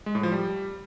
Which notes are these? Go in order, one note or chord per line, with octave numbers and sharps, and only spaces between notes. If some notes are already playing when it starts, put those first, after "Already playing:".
G#3
A2
F3
G3